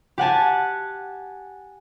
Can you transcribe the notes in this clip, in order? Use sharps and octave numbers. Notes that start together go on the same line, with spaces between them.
G4 F#5 G#5 A5